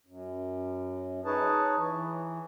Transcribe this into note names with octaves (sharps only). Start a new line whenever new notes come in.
F#2
D#4 G#4 B4 C#5 A5
E3